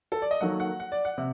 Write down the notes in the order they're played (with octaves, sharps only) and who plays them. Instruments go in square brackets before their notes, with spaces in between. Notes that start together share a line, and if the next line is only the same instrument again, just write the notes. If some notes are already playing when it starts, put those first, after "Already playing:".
[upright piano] A4
D5
D#5
[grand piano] D#3 F#3 A#3 F#4 A4 [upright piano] F#5
[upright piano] F#5
F#5
D5
F#5
[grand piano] C3